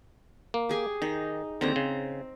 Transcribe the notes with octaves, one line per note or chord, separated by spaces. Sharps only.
A#3
G4 G#4 G#5
D#3 D#4
D#2 D3 C4 A#5
C#3